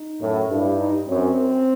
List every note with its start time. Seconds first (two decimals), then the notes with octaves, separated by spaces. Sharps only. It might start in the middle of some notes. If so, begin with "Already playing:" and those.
Already playing: D#4
0.20 F#2 A2
0.50 G2 E4
0.78 D#4
1.07 F#2 C4